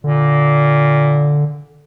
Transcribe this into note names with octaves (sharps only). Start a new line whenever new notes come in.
A#2 D3